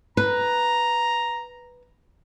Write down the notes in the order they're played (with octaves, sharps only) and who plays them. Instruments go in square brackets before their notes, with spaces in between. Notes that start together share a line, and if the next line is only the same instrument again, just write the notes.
[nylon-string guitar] B4 [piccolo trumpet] A#5